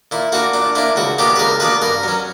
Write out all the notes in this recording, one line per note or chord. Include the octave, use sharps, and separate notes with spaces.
A#2 E4
A#3 D4 F#4
A#2 D4
A#3 D4 E4
C#2 F#4
B2 A#3 D4 G4
B4
C#2 A#4
B2 A#3 D4 B4
G2 A#4
F#3 C#4